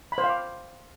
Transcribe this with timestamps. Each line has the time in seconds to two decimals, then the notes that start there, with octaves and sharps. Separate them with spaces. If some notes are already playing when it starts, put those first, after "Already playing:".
0.12 B5
0.18 C5
0.24 F5
0.29 D6